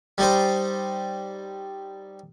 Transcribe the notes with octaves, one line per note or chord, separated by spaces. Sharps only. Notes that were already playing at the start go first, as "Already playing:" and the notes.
G3 D#4 C5